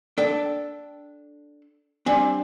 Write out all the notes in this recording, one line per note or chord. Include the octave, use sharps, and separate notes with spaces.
D4 A4 D5 G5
G3 C4 D4 D5 G#5